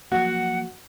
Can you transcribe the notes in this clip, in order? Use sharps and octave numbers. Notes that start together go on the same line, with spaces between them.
F3 F#3 A#3 F#4 F#5